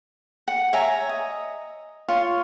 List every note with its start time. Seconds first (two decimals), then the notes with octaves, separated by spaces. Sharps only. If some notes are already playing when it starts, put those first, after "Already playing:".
0.48 F#5
0.73 C#5 E5 G#5 A#5
1.09 D#5
2.08 F4 C#5 C6